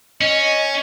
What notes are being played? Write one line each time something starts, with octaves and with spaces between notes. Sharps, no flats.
C#4 D#5